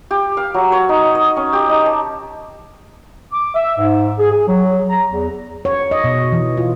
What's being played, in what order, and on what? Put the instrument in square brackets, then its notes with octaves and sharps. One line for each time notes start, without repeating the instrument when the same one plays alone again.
[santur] G4
F5
F#3
C#5
D#4
D#5
C#4
G4
D#4
A5
[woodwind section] D6
E5
G#2
G#4
G#4
F#3
A#5
E2
[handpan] C#5
D#5
B2
E3
F4